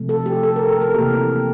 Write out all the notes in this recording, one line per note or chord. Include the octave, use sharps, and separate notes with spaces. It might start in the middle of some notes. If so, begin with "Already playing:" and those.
Already playing: C3 F3 A3
A4
G4
A4
A#4
A4
A#4
C3 E3 A#3 G4